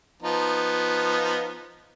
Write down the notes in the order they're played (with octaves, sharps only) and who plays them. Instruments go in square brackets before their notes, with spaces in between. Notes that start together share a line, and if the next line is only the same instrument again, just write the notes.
[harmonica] F3 B3 D#4